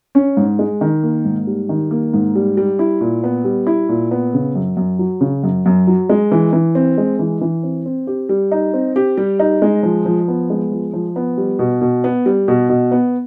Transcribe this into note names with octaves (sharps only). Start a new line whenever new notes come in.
C#4
G#2
G#3
D#3
A#3
G#2
G3
D#3
A#3
G#2
G3
G3
E4
A#2
B3
G3
E4
A#2
B3
C#3
F#2
F#2
F#3
C#3
F#2
F#2
F#3
G#3
E3
E3
C4
G#3
E3
E3
C4
C4
G4
G3
D#4
C4
G4
G3
D#4
G#3
F3
F3
B3
G#3
F3
F3
B3
G3
B2
B2
B3
G3
B2
B2
B3